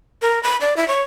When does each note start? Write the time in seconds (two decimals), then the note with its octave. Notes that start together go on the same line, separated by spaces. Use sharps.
0.22 A#4
0.43 B5
0.61 D5
0.77 E4
0.88 C#5